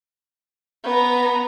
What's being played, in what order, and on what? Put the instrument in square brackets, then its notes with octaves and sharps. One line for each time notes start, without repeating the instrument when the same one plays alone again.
[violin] B3 A#5